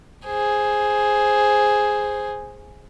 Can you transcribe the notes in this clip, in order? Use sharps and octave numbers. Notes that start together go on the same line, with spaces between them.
G#4 C5